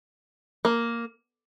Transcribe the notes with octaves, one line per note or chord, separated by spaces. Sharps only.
A#3